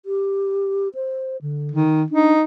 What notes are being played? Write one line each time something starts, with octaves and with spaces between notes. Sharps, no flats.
G4
C5
D3
D#3
D4 D#4